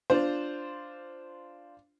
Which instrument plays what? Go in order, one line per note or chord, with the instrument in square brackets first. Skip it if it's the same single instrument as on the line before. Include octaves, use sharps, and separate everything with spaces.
[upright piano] D4 F4 C5